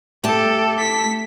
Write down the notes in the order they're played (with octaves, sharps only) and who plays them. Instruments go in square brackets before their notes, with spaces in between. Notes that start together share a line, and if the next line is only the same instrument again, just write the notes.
[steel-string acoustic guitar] A3 A5 [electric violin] G4 A4
[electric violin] B6